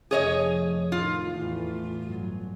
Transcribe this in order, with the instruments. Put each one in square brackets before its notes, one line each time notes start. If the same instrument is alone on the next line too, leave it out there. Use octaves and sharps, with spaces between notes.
[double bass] F1 F3 [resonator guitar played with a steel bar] G#4 C#5 D#5
[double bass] A2 D#3 [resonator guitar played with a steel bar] F4
[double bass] E2 A2
G1 F#3